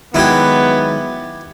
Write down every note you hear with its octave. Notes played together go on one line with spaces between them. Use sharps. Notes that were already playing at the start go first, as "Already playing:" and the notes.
D#3 F#3 G#3 B3 E4 G4